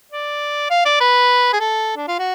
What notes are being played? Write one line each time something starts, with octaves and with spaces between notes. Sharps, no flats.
D5
F5
D5
B4
G#4
A4
D4
F4
F#4